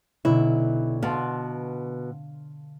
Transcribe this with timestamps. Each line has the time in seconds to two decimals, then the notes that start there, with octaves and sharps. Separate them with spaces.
0.25 B1 D3 E4
1.03 B2 B3 F5 A5 C6